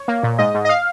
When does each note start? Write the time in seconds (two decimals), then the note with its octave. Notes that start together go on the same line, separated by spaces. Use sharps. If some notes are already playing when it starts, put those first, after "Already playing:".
Already playing: C#5
0.08 A#3
0.23 A#2
0.39 G#2 D#5
0.55 G#2
0.65 D#5
0.69 F5